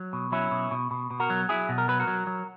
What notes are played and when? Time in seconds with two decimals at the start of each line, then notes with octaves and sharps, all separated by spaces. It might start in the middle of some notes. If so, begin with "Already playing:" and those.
Already playing: F#3
0.13 B2
0.32 F#3 C#4 E4
0.51 B2
0.71 B2
0.91 B2
1.11 B2
1.20 F#4 A#4
1.30 F#3
1.49 F#3 E4 G#4
1.69 B2
1.78 A#4
1.88 F#3 B4
2.00 F#4 A#4
2.08 F#3
2.27 F#3